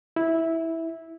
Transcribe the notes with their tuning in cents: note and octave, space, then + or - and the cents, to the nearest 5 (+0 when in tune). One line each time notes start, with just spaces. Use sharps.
E4 -10